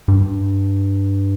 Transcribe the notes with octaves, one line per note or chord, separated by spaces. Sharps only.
G2